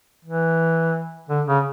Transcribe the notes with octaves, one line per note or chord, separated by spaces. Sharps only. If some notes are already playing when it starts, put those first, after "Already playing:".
E3
D3
C#3